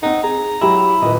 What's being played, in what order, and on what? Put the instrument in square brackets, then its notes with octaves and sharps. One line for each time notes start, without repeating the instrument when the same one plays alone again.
[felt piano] C4 F#5 [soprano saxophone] D#4
[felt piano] G#4 [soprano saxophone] A#5
[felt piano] F#3 G4 [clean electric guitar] E4
[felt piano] D#1 B4 [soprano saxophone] D#5